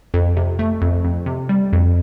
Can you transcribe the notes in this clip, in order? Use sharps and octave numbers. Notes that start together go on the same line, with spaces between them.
F2
C3
A3
F2
F2
C3
G3
F2